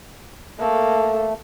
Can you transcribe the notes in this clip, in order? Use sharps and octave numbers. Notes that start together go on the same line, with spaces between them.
A3 A#3 A4